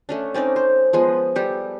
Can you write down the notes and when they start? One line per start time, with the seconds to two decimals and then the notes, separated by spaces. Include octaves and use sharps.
0.09 A3 C#4 D4
0.34 C4 C#4 D#4 D5
0.56 C5
0.93 F3 G#3 B3
1.36 G3 G4 A4